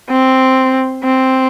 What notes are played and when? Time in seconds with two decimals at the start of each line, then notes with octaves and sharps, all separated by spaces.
0.10 C4
1.04 C4